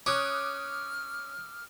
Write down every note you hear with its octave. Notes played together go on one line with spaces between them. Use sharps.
C#4 D6 D#6 F6 F#6